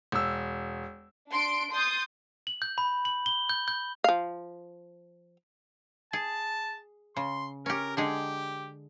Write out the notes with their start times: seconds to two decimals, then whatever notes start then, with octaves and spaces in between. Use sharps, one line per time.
0.12 E1 E6
1.29 D4 C6 D7
1.71 C6 D#6 G6 A6
2.47 F#7
2.62 G6
2.78 B5
3.05 F#7
3.26 G7
3.50 G6
3.68 G6
4.04 F3 F5
6.13 G#4 A5
7.16 C#3 C6
7.66 C#4 G4 A#4
7.97 D3 G#3 G4 G#4